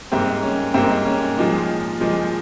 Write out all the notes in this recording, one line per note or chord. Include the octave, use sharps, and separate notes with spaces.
G#2 G3 A#3 C4
C#4
G#2 G3 A#3 C4
C#4
A#2 F3 G#3 D#4
A#2 F3 G#3